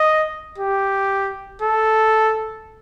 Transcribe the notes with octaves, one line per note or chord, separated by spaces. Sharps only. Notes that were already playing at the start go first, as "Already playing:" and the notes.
Already playing: D#5
G4
A4